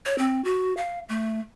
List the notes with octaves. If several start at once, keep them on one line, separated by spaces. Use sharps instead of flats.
C#5
C4
F#4
F5
A3